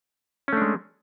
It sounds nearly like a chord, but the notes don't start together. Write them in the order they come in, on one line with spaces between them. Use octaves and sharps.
C#4 A3 D4 G#3